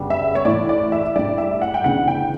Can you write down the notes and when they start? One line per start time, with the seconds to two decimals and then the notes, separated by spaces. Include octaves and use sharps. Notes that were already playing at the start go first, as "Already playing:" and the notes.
Already playing: F#2 C#3 G3 B3 D4
0.10 E5
0.35 C#5
0.45 A2 E3 A3 D5
0.69 D5
0.92 E5
1.15 A2 G3 D4 D5
1.38 E5
1.62 F#5
1.74 G5
1.84 D2 C#3 E3 B3 D4 F#5
2.08 G5